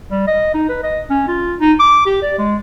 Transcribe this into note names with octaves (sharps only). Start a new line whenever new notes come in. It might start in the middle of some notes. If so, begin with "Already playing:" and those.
G3
D#5
D#4
B4
D#5
C#4
F4
D#4
D6
G4
D5
G#3